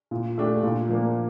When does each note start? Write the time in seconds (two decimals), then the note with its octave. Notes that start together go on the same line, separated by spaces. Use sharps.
0.11 A#2
0.38 A3 D4 G4
0.63 A#2
0.89 F3 A#3 D4